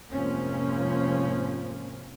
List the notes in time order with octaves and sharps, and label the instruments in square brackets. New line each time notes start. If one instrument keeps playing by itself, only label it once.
[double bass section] F1 G#2 F3 A#3 C4 C#4